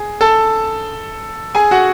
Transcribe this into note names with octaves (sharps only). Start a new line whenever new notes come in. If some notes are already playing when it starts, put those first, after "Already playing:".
Already playing: G#4
A4 A5
G#4 G#5
F#4 F#5